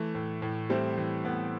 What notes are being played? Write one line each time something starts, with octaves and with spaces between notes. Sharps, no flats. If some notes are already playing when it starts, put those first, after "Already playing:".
Already playing: E3 A3
A2
A2
G3 A3 C4
E3
A2 B3